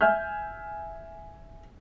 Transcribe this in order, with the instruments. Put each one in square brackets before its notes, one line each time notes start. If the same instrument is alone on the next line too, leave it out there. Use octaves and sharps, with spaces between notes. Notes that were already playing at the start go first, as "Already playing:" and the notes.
[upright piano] E5 G#5 F6 G6